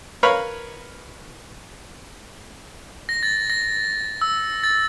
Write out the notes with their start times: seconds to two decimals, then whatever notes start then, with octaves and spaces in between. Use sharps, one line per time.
0.23 A#4 B4 C#5 F5 B5
3.09 A#6
3.23 A6
3.50 A#6
4.21 E6
4.64 A6